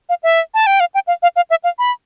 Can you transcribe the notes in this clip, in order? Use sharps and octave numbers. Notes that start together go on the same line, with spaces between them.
F5
E5
A5
G5
F5
G5
F5
F5
F5
E5
F5
B5